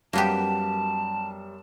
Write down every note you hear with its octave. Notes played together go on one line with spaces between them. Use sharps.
F#2 G3 A#3 B3 G4 A5